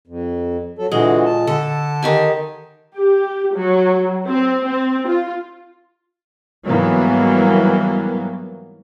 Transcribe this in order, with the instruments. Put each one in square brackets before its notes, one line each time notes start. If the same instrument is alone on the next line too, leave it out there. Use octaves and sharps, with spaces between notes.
[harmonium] F2
F#3 A4
[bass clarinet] A#2 [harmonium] D3 E3 F#4 [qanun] G#3
[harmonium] A5
[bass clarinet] D3 [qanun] A4
[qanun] D#3 G4 G#5
[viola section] G4
F#3
C4
C4
F4
[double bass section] G#2 E3 F#3 G3 A#3 B3